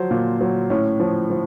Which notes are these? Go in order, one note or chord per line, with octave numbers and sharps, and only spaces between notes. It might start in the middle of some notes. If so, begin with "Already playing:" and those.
Already playing: F3 F#3 C5
A#2
F#3
A2 C#4
F3
F3